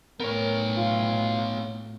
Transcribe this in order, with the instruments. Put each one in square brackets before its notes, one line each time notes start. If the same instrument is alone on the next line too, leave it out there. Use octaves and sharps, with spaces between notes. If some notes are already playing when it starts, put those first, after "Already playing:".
[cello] A2 [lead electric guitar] B3 C#5 [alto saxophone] A#4
[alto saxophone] F4